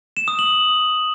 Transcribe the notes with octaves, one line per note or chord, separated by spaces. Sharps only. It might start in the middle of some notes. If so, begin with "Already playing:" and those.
E7
D#6
F#7